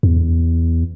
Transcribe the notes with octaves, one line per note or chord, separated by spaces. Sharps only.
E2